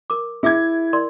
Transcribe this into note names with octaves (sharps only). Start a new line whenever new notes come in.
A#4 D6
E4 G#4 E5 D6 G#6
A#4 D5 C6